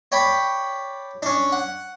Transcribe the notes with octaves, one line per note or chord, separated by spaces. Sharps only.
C#5 D5 G5 B5
C#4 D4
F#5